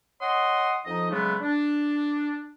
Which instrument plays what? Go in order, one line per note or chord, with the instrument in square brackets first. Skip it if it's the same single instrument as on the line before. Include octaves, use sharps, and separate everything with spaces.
[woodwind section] C#5 D#5 F#5 C6 D#6
F2 F3 D#4 D#5
C#3 F#3 G#3 A3 B3
D4